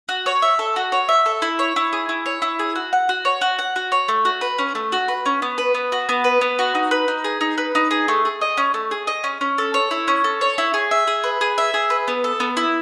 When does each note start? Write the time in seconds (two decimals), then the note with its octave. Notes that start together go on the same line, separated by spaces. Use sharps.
0.09 F#4
0.26 C#5
0.42 E5
0.59 A4
0.76 F#4
0.92 C#5
1.09 E5
1.26 A4
1.42 E4
1.59 C#5
1.76 E4
1.93 G#4
2.09 E4
2.26 C#5
2.42 E4
2.59 G#4
2.75 F#4
2.93 F#5
3.09 F#4
3.25 C#5
3.41 F#4
3.59 F#5
3.76 F#4
3.92 C#5
4.08 A3
4.25 F#4
4.41 B4
4.59 C#4
4.75 A3
4.92 F#4
5.08 B4
5.26 C#4
5.42 B3
5.58 B4
5.75 B3
5.92 F#4
6.09 B3
6.24 B4
6.41 B3
6.59 F#4
6.75 D#4
6.91 B4
7.08 D#4
7.24 G#4
7.41 D#4
7.58 B4
7.75 D#4
7.91 G#4
8.08 A3
8.25 G#4
8.41 D#5
8.57 C#4
8.74 A3
8.91 G#4
9.07 D#5
9.24 C#4
9.41 C#4
9.58 A4
9.74 C#5
9.91 E4
10.08 C#4
10.24 A4
10.41 C#5
10.58 E4
10.74 G#4
10.91 E5
11.07 G#4
11.24 B4
11.41 G#4
11.58 E5
11.74 G#4
11.90 B4
12.08 B3
12.24 A4
12.40 B3
12.57 E4